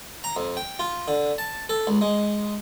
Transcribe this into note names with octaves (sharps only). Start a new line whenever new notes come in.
A#5
F2
G5
F4
D3
A5
A4
C#2
G#3